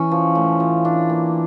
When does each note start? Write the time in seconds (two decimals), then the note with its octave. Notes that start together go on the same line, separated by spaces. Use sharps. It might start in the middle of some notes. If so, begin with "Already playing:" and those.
Already playing: E3 C#4
0.11 F3
0.35 A2
0.60 F3
0.85 D4
1.10 A#3